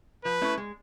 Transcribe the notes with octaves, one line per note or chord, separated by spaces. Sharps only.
F3 B4
A3 C#4 E4
G#3